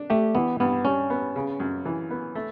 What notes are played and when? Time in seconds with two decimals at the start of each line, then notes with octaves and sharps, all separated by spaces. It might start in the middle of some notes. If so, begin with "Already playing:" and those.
Already playing: D4
0.10 A3 G4
0.35 E3 B3
0.60 G2 B3
0.85 G3 C#4
1.10 B3
1.36 C#3
1.60 F#2
1.85 E3
2.10 B3
2.35 A3